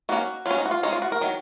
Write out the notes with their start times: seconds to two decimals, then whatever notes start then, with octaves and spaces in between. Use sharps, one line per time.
0.09 D#3 A#3 C#4 F#4
0.46 F#3 C#4 F4
0.58 D#4
0.66 F#4
0.71 F4
0.83 G#3 C#4 D#4
0.93 F4
1.02 F#4
1.12 A#4
1.21 D#3 F#3